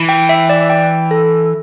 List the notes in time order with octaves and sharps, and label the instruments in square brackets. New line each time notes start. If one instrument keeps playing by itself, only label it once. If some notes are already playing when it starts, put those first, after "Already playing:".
Already playing: [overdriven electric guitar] E3
[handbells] G5
E5
D5
G5
A4